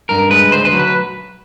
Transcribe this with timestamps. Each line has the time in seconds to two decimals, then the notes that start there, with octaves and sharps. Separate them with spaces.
0.09 G2 A#4
0.30 G#3 B4
0.51 D2 C5
0.65 B4
0.73 F#3
0.79 B4